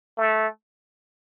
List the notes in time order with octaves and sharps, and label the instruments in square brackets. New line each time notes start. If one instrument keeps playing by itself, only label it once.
[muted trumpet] A3